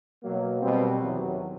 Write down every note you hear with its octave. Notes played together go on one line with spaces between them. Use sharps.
B2 F#3 A#3
B2 G3 C4
E2 C3 D#3 F#3